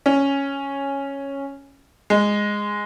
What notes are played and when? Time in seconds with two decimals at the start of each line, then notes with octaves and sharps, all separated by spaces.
0.06 C#4
2.10 G#3